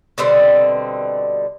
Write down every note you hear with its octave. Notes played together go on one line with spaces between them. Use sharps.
B2 D3 G3 C4